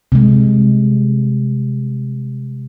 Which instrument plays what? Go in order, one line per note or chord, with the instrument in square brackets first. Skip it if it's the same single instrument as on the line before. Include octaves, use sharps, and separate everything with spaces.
[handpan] C3 G#3